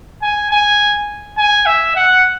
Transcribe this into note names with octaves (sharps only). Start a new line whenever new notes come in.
G#5
G#5
G#5
E5
F#5